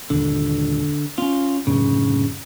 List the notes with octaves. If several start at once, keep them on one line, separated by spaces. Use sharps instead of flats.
A#1 D#2 D3
C4 C#4 F4
F#2 A2 C#3 C#4